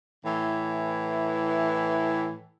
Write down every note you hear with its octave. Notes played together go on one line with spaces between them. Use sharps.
A2 E3